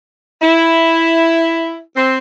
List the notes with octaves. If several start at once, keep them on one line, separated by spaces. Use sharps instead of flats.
E4
C4